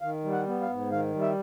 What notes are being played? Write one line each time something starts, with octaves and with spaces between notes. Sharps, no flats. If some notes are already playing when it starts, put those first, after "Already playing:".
D#3 F5
G3
F#5
B3
F5
G#2
D#3 F5
G3
E5